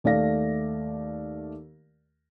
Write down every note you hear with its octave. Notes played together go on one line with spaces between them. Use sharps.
D#2 A3 D5 F5 A#6